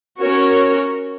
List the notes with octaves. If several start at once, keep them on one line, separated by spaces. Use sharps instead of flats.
C#4 F#4 A#4 C#5